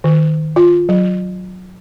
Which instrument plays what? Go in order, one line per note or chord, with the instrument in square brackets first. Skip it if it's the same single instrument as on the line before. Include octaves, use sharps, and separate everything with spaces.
[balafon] D#3
F4
F#3